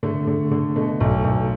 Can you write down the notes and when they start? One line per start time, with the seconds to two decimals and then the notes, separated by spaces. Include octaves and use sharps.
0.03 D3 A3
0.27 D3
0.51 D3
0.76 B2 A3
1.00 B1
1.24 B1